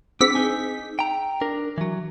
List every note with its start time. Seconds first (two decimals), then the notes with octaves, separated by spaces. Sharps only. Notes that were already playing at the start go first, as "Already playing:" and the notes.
0.21 C4 D4 G#4 E6 B6
0.35 D#4 G#5
0.99 G5 A#5
1.41 D4 A#4
1.78 E3 F#3